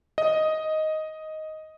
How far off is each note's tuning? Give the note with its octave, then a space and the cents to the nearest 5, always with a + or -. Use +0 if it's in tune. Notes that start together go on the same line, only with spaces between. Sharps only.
D#5 +5